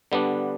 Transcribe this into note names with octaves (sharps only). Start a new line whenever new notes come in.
D3 G3 B3 D4